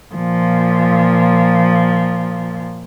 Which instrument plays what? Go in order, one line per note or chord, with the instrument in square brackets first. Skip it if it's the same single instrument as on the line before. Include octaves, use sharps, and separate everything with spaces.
[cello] A#2 F3